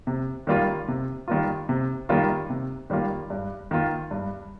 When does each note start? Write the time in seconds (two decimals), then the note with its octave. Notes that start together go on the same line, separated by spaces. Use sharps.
0.07 C3
0.47 D#3 G3 A#3 F4
0.88 C3
1.28 D#3 G3 A#3 F4
1.69 C3
2.09 D#3 G3 A#3 F4
2.50 C3
2.90 D#3 G3 A#3 F4
3.30 G2
3.71 D#3 A#3 F4
4.11 G2